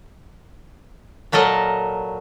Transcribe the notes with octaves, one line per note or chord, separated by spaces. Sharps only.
A#2 F#3 A4 A#4 D#5